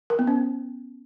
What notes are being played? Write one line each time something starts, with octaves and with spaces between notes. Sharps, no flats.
A#4
B3
C#4